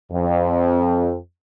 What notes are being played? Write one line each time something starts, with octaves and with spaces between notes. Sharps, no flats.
F2